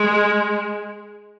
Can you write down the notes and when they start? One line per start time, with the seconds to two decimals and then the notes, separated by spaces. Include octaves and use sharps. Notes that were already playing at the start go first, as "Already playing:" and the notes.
Already playing: G#3